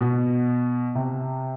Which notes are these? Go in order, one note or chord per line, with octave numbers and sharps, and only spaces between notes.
B2
C3